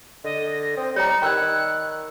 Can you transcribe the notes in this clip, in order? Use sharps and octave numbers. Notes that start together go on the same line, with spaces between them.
D3 D#5
A#6
C4 D#6
G3 C#5 D#5 A#5 C#7
D#3 D5 G5 B5 E6 F#6